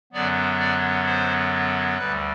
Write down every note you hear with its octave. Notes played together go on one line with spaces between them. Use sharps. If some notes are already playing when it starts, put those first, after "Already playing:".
F#2 D3 F#3 B3 D5
D5
C5
D2 D3 G3 B4